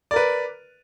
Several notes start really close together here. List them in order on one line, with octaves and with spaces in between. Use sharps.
D5 A#4 B4